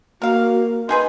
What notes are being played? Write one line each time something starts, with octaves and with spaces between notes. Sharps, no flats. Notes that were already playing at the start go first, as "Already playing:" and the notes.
A#3 F#4 A#4 F5
D#4 G#4 B4 C6